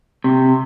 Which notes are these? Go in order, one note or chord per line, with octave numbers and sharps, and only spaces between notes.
C3